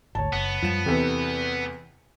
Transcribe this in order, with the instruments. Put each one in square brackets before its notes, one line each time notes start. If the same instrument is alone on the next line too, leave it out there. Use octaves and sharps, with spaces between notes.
[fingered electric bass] G#1 D2 [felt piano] C#5 A5
[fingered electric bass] F#1 [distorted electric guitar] B3
[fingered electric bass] F#2 G3 [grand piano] F3 E7
[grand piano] E2 C3 [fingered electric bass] E3 [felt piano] A4 B4